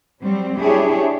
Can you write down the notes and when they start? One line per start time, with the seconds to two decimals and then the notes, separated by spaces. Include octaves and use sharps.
0.21 F#3 G3 C4
0.58 D4 E4 G4 G#4 C#5